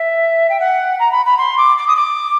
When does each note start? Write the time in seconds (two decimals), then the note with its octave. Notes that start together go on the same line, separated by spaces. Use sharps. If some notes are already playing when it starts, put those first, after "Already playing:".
Already playing: E5
0.50 G5
0.60 F#5
1.00 A#5
1.12 B5
1.26 B5
1.38 C6
1.58 D6
1.78 D6
1.87 D#6
1.96 D6